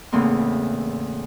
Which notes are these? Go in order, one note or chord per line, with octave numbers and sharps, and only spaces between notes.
E2 A2 C#3 A#3 C4